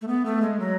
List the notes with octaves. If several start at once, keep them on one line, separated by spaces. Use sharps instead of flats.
A3
B3
A3
G#3
F#3